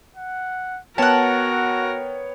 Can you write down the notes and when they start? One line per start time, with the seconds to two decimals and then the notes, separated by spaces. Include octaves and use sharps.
0.16 F#5
0.98 B3 F#4 A#4 C#5 F#5 G5 A5